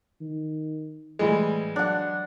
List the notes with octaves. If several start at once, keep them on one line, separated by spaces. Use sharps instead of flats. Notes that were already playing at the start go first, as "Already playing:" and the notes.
D#3
A2 E3 G3 G#3
F#3 D4 F#5